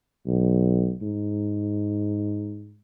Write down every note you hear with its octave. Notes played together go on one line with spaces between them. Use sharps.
B1
G#2